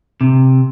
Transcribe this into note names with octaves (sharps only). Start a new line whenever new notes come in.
C3